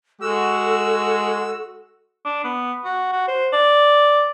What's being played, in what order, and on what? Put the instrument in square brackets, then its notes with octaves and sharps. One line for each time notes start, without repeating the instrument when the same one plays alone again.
[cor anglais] G#3 [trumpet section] F#4 [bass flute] A4 [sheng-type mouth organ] E6
[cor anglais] D4
B3
F#4
F#4
C5
D5